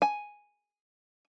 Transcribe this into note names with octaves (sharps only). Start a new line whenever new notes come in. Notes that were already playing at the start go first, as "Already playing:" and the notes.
G#5